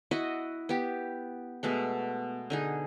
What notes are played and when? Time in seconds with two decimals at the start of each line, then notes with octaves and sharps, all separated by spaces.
0.11 E4 F#4 D#5 F#5
0.69 B3 G4
1.63 B2 G#3 A3
2.50 D3 D#4 G#4